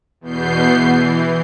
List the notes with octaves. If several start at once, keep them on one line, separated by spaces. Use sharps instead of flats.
E2 B2 B3 G6 C7
E3